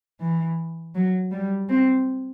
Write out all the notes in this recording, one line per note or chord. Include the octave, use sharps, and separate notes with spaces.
E3
F#3
G3
C4